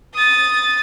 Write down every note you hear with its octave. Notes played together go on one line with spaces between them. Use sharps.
D#6 A6